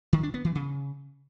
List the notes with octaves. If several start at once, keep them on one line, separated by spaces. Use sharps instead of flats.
D#3
D4
B3
E3
C#3